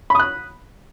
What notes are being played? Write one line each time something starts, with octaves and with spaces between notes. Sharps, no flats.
B5 D#6 F#6